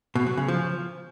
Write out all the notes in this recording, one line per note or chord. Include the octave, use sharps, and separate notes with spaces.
B2
F#3
C#3
F3